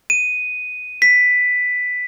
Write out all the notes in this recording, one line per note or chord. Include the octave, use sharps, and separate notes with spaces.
D#7
B6